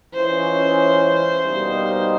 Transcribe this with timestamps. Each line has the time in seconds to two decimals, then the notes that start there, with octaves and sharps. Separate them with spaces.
0.14 E3 G#3 C#4 F4 C5
1.45 B2 G3 A#3 D#4